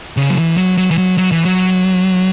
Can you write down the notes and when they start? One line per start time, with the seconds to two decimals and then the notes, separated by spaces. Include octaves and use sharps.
0.17 C#3
0.30 F#3
0.37 E3
0.57 F#3
0.77 F#3
0.91 E3
0.98 F#3
1.18 F#3
1.32 E3
1.45 F#3